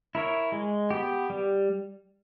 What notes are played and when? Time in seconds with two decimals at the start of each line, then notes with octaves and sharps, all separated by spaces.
0.15 E4 A#4 C#5
0.52 G#3
0.91 B3 G4
1.30 G3